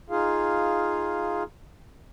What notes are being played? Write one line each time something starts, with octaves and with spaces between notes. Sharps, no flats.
D#4 F4 G#4 F5